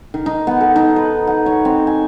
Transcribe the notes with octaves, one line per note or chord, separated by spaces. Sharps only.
D#3
D#4
B3
A4
D#4
B4
F#5
C#5
C4
G#5